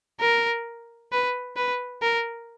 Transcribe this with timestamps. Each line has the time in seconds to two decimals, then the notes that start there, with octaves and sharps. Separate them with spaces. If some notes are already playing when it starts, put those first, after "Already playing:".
0.21 A#4
1.12 B4
1.57 B4
2.02 A#4